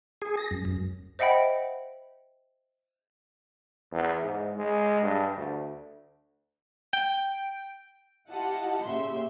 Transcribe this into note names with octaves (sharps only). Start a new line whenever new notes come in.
G#4
A#6
F#2
F#2
C5 D#5 E5 F#5 G5 B5
E2
G#2
G#3
G2
D2
G5
E4 F4 G4 D#5 F#5 A5
A#2 C#3 G4 E5 C6